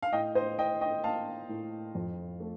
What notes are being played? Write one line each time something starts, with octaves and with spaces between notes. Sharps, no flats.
F5
A2 D#5 G5
C5 D#5
A2 D#5 G5
D#5 G5
A#3 F5 A5
A2
F2
A3